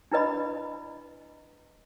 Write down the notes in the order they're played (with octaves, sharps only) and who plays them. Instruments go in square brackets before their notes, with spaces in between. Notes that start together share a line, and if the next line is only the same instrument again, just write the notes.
[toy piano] D4 E4 B4 D#5 B5